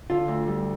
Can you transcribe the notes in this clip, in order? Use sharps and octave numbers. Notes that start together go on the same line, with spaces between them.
D3 F4
D2
G3